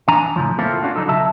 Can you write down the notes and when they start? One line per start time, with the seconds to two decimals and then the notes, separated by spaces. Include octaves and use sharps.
0.08 E3 D4 G#5 A#5
0.36 A2 C#3 F3 F#3
0.58 A3 A#3 C4 E4 F4 A4
0.83 C#4 D4 F4 F#4
0.96 D3 F#3 D#4 A4
1.07 B1 C#3 F#3 E5 A5